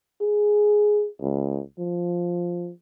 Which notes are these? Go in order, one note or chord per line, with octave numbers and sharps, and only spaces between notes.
G#4
C#2
F3